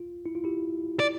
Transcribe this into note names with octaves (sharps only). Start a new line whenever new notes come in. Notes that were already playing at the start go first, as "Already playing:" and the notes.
Already playing: F4
E4
F4
E4 G4
D5